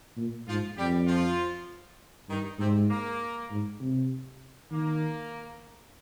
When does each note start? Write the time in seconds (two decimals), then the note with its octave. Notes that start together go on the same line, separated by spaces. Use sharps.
0.17 A#2
0.47 G#2 F3 F4
0.77 F2 G3 G4
1.08 F3 F4
2.28 G2 D#3 D#4
2.59 G#2 C3 C4
2.90 A#3
3.50 G#2
3.80 C3
4.71 D#3 A#3